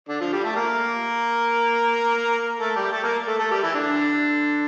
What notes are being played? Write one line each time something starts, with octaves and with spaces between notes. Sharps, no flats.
D3 D4
F3 F4
G3 G4
A3 A4
A#3 A#4
A3 A4
G3 G4
A3 A4
A#3 A#4
A3 A4
A3 A4
G3 G4
E3 E4
D3 D4